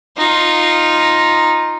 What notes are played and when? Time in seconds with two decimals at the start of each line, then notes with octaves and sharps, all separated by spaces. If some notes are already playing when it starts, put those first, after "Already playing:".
0.18 D#4 F4